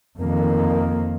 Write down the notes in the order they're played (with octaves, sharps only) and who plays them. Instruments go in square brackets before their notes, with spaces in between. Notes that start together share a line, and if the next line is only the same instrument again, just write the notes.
[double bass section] F2 D#3 A#3